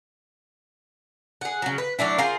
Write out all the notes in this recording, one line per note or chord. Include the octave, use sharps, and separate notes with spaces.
G#4 F#5
C#3 F#3
B4
F#3 A3 D4 E4
F4 G#4 A#4 C5